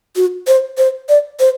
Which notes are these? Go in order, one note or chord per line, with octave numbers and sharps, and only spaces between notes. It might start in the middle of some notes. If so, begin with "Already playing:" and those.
F#4
C5
C5
D5
C5